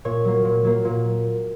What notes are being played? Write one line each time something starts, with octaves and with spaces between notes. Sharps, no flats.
A#2 C#5
F#3 A#3
A#2
F#3 A#3
A#2